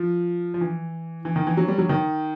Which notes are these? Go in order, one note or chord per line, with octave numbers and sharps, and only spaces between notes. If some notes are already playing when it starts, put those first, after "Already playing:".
Already playing: F3
F3
E3
E3
D#3
E3
F#3
G3
F#3
D#3